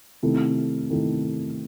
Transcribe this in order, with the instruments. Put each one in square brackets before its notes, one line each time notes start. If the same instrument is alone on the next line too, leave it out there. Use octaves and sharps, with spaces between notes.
[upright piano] C3 D#3 A3 E4
C3 D#3 A3 E4